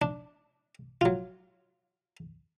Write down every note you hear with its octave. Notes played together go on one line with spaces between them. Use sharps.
D4
F#3 F4